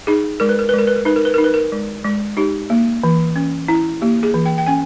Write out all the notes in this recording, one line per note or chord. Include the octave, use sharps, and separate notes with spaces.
D#4 G#4
G#3 A#4
B4
A#4
B4
G#3 A#4
B4
A#4
D#4 B4
A#4
B4
D#4 A#4
B4
A#4
G#3
G#3
D#4 G4
A#3
E3
C#4
E4
A#3 G4
G#4
E3
G5
G5
C#4 G#5